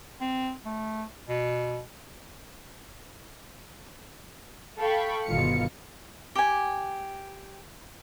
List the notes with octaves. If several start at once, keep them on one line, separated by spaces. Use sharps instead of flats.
C4
A3
B2
A4 F5 G5 B5 C#6
G1 B2 D#3 F4 F5 C#7
G4 G#5